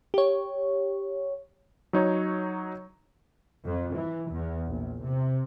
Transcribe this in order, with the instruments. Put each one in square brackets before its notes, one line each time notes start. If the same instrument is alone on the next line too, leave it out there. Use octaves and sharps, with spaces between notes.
[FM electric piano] G4 C#5
[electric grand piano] F#3 D#4 C#5
[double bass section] F2
E3
E2
A#1
C3